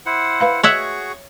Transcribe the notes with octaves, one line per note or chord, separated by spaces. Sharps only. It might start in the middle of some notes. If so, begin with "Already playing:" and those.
E4 C5 F#5
B4 F5 B5
F#4 G#4 C#5 E5 F#5 C#6